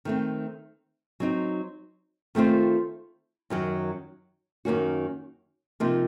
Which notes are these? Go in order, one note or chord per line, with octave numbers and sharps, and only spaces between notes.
D#3 A3 C4
F#3 C4 D#4
D#3 A3 C4 F4 C5
F#2 D#3 F#3
F#2 D#3 A#3 C#4 F#4
C3 F3 A#3 D#4